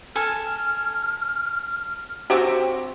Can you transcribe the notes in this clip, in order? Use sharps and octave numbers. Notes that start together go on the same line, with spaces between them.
A4 G#5 F6
C4 F#4 G4